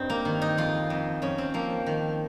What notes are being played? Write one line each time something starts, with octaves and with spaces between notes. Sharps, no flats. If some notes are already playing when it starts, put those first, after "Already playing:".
Already playing: G2 C4 D#4
A#3
D#3
D#4
F2 F4
F2
F2 C#4
C4
F3 A#3
D#3